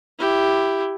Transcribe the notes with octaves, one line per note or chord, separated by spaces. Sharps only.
E4 G4